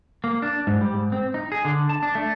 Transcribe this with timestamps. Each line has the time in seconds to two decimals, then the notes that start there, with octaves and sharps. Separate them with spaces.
0.24 A#3
0.42 D4
0.67 G#2
0.81 G3
0.94 G#2
1.12 C4
1.34 D#4
1.52 G#4
1.65 D3
1.89 A5
2.03 D4
2.15 A3